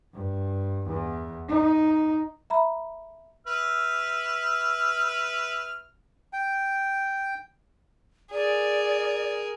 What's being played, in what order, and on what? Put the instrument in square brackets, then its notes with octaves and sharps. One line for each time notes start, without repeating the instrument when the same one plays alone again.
[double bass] G2
E2
D#4
[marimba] E5 A#5 B5
[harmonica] B4 E5 F6
[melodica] G5
[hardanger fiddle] G#4 A#4 [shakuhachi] D5